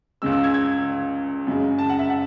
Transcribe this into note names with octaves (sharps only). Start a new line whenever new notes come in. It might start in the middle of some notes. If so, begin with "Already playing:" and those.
C#2 C#3 G#3 E6
E6
G#6
G#6
F#2 C#3 G#3
A5
F#5
E5
F#5